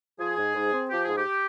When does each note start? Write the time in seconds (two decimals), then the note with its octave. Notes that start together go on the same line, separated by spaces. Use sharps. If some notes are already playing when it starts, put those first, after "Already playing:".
0.19 F3 G#4
0.37 G#2
0.55 G#2
0.72 C4
0.90 F3 G4
1.04 G#2 G#4
1.18 G4